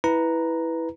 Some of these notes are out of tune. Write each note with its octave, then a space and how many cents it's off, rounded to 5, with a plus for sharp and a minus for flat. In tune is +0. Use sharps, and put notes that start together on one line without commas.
E4 -10 B4 +0 A#5 +0